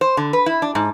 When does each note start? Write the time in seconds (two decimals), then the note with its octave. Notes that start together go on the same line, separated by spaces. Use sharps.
0.01 C5
0.17 D3
0.33 B4
0.46 E4
0.62 D4
0.75 G#2